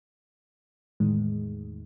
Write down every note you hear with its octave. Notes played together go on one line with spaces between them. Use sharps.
E2 A2 D#3 G#3